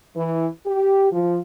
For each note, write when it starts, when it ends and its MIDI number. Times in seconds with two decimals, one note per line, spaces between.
0.15 0.46 52
0.66 1.10 67
1.11 1.38 53